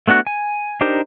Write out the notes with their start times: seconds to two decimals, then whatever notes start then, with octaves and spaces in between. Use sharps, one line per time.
0.08 A3 B3 D4 F#4 F#6
0.27 G#5
0.81 D4 D#4 G4 A#4 C5